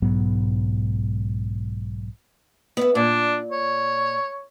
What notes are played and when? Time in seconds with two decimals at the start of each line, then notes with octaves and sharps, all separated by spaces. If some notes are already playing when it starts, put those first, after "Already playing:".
0.02 B1 G#2 F#3 B3
2.77 B3 B4 E5
2.95 A#2 D4
3.51 C#5